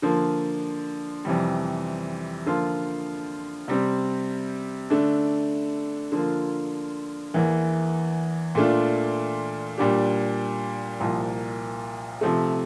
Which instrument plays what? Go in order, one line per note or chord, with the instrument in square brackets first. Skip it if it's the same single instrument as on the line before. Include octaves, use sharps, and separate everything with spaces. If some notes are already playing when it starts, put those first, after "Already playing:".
[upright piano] D3 F3 A#3
F2 C3 E3 G3
D3 F3 A#3 F4
C3 G3 C4
D3 A3 D4
D3 F3 A#3 F4
E2 E3 A#3
A#2 A3 D4 F4
A#2 G3 D4 G4
C2 A#2 F3
C3 F3 A3